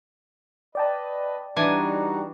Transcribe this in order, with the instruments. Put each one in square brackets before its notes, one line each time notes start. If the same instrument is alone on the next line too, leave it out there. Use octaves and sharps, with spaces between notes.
[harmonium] B4 D#5 [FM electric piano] D5 G5 A5
[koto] E3 D4 G#5 [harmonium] G3 D#4 F#4